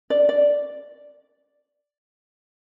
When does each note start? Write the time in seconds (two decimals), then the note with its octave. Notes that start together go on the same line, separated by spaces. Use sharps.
0.10 D5
0.29 D5